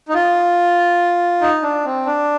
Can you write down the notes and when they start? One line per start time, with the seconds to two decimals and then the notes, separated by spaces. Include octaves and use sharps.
0.09 D#4
0.14 F4
1.41 D#4
1.63 D4
1.85 C4
2.06 D4